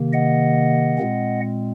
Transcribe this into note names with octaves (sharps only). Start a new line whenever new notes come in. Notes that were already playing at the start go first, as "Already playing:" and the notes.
Already playing: C3 D#3 A#3
D#5 F#5
A#2 G#3 C4